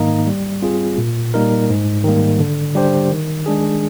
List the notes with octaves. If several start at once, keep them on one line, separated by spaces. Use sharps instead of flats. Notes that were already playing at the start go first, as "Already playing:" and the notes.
Already playing: G#2 D#3 A#3 D#4
G3
C4 F4 G#4
A#2
G3 A#3 D#4 A#4
G#2
D#3 G3 A#3
D3
G3 D4 G4 C5
D#3
G#3 D4 G#4